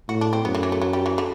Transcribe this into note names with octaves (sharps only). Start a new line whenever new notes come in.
A2 F#4
D4
C4
F#2 B3
D3
E3
A3
F#3
G3
E3
D3